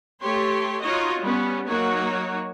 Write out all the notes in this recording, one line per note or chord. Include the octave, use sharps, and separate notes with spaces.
A3 G4 C#5 C6
D#4 F4 F#4 C#5 D#5
G3 B3 C#4
F#3 A#3 D#4 F#4 C#5